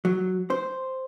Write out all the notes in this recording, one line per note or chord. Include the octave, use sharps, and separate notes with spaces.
F#3
C5